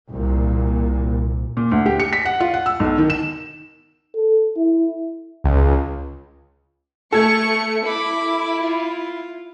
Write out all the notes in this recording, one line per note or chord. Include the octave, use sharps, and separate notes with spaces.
C2 A#2
A#2
D2
G4
C#7
B6
F#5
F4
F#5
E6
B1
D#3
E7
A4
E4
C#2
A3 A4 C#6 G#6 C#7
E4 B5 D6
F4